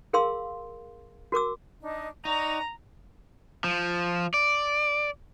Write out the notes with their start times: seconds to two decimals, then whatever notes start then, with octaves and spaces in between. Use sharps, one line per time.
0.13 G#4 A#4 F5 C6 E6
1.32 F#4 A#4 D6 E6
1.81 D4 D#4 D#5
2.25 D#4 D5 F#5 A#5 C#6
3.64 F3
4.34 D5